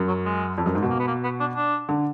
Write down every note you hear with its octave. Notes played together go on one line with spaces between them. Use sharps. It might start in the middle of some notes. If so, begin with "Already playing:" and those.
Already playing: F#2
F#3
G#3
F2
F#2
G#2
B2
A#3
B3
A#3
B3
D4
D4
D3